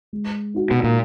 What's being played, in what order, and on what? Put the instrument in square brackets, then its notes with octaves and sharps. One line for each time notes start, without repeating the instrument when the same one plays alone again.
[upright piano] G#3
D#4 F#4
[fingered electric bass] B2
A#2